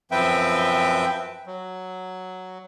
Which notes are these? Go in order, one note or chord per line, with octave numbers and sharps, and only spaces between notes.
F#2 F3 C4 B4 E5 G5
F#3